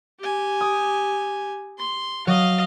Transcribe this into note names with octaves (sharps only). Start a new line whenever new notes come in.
G4 G#5
D#6
C6
F#3 D#5 F5